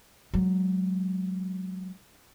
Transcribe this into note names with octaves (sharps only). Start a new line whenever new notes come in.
F#3 G#3